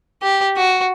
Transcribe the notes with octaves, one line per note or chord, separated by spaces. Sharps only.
G4
F#4